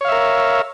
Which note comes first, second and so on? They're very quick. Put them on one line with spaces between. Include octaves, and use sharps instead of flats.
C#5 F5 E5 A#4